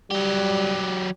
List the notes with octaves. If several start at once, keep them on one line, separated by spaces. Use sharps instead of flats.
F#3 G3 G4